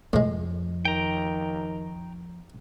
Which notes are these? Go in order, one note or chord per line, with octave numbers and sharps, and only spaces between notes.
F2 A2 G#3
D#3 G5 A#5